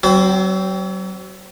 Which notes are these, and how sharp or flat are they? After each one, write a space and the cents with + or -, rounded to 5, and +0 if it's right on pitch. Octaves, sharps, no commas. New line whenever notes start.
F#3 +35 C4 -5